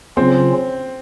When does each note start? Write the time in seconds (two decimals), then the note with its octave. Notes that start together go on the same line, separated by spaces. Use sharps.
0.17 C#3 F#3 C4 C#4 F4